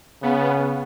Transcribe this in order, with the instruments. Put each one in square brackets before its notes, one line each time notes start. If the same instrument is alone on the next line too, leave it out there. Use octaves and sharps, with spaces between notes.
[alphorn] C#3 [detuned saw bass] B3